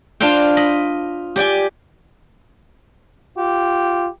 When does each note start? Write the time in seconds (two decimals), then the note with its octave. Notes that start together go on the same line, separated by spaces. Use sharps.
0.20 D4 F4 C5 F5 G5
0.57 D#5 B5
1.36 G4 D5 G5 G#5
3.38 F4 G4